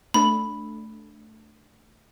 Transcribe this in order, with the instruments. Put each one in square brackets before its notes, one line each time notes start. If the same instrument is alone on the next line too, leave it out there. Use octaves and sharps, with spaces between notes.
[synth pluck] A3 D4 A4 [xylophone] B5